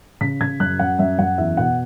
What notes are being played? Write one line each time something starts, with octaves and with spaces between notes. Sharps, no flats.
C#3 B6
C#3 G#6
F#2 F#6
F#2 F#5
F#2 E5
F#2 F#5
E2 E5
B2 F#5